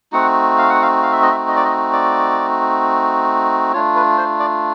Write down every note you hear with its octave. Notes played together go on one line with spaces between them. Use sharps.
A3 C4 D#4 F#4 F#5
F5
F#5
F5
F5
E5
D#5
E5
D#5
D5
D#5
D5
A3 D4 F4 C#5
B4
C5
D5